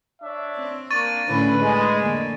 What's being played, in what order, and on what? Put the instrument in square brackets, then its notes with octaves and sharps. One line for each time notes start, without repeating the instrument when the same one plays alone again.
[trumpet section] D4 C#5 E5
[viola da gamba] C4
[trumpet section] A#3 D4 [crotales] C#6 A6 D#7
[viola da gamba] A2 D3 C#4 [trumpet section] B4
[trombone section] G#3 [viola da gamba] D#5
[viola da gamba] F2 D3 A#3